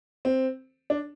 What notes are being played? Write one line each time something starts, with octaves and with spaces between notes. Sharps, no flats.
C4
D4